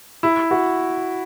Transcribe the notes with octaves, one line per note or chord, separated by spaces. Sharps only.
E4
F#4